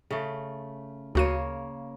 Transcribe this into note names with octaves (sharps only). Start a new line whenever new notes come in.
C#3 A3
D2 C#3 A#3 F#4 C#5 D#7